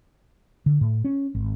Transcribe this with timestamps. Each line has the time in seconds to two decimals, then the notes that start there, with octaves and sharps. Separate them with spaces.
0.66 D3
0.81 A2
1.05 C#4
1.35 G#1